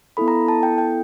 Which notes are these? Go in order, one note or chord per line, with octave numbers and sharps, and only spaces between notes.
B3 E4 A4 B5
A#5
A5
G5
G5